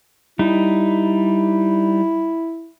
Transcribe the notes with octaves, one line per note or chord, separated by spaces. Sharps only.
G3 D#4 E4